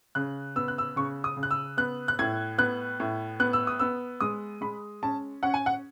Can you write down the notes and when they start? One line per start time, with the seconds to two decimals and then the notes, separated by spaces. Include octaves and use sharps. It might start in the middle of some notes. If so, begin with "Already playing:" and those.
0.15 C#3 F#6
0.56 B3 E6
0.68 F#6
0.78 E6
0.96 C#3 C#6
1.24 D#6
1.37 C#3
1.43 F#6
1.51 E6
1.77 B3 F#6
2.08 F#6
2.19 A2 G#6
2.58 B3 F#6
3.00 A2
3.40 B3 F#6
3.53 E6
3.67 D#6
3.80 B3 E6
4.21 G#3 D#6
4.61 G#3 B5
5.03 C#4 A5
5.43 C#4 F#5
5.54 G#5
5.66 F#5